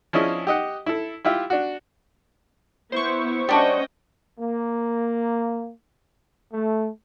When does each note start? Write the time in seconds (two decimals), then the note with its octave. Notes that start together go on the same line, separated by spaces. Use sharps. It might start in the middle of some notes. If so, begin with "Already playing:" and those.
0.13 F3 C#4 D4 E4 G#4 D#5
0.47 G4 D#5 F#5
0.86 E4 A4
1.25 E4 F4 G4 E5
1.50 D4 F#4
2.92 B3 E4 C5 C#6
3.49 G3 C#4 D4 F#4 D#5 G5
4.39 A#3
6.53 A3